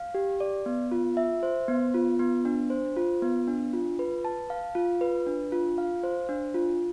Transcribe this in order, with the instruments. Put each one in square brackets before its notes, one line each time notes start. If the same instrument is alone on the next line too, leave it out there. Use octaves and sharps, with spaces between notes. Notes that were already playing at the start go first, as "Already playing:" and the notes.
Already playing: [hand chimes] F5
G4
D5
B3
F4
E5
C5
B3
F4
B3
D4
C5
F4
B3
D4
F4
B4
A5
F5
F4
B4
D4
F4
F5
C5
D4
F4